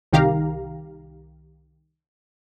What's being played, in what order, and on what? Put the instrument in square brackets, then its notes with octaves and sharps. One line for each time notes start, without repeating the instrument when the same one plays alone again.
[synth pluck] C2 D#3 G4 F5 A#5